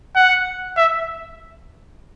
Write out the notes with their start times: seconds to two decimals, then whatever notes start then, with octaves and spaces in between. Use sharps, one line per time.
0.16 F#5
0.77 E5